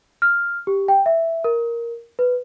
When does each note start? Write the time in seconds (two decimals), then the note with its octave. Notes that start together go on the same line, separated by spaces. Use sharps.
0.22 F6
0.67 G4
0.88 G5
1.06 E5
1.44 A#4
2.19 B4